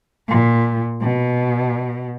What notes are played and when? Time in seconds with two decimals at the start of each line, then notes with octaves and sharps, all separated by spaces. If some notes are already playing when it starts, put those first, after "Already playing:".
0.29 A#2
1.02 B2